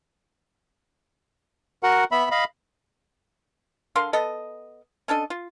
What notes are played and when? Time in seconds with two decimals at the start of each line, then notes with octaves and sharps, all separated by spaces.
1.83 F#4 A#4 F#5
2.12 B3 E5 B5
2.31 D#5 F5 B5
3.95 D3 A#4 F5 C6
4.13 B3 A4 D#5
5.08 C#4 D4 A4 D#5
5.30 F4